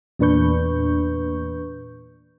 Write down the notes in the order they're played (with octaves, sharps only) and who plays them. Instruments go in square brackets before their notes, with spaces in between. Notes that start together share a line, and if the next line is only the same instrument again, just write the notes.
[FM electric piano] E2 A#2 D4 B4 C#6 G6